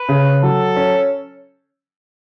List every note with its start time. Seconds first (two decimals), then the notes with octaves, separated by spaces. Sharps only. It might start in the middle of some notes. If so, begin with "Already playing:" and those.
Already playing: B4
0.09 C#3
0.42 F#3 A4
0.76 C#4